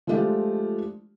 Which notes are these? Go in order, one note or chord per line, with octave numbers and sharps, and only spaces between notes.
F3 G#3 A3 D4 F4 G4